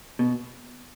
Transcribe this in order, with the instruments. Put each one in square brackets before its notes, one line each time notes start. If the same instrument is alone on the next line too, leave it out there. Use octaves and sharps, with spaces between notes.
[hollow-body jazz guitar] B2